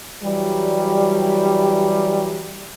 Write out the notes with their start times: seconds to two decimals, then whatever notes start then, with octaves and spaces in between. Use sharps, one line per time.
0.25 E3 F#3 G3